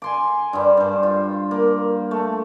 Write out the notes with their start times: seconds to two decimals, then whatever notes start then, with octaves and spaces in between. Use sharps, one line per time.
0.02 G#5 C6 D6
0.53 G2 G3
0.77 G2 C5
1.03 F4
1.51 A#3
2.11 A3